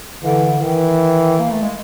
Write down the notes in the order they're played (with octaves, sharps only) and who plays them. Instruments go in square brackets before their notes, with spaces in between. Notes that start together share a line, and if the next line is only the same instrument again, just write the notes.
[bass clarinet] D3 [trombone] E3
[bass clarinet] D#3 [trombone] E3
[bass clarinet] A#3
A3
G#3